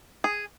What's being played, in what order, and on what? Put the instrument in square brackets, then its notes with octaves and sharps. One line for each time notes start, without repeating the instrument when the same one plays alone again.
[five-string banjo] G#4